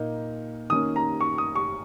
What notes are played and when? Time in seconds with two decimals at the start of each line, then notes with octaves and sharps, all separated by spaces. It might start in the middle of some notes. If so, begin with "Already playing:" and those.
Already playing: A#2 A#3 D#4
0.70 D#3 A#3 C#4 D#6
0.96 A#5
1.21 C#6
1.38 D#6
1.56 C#6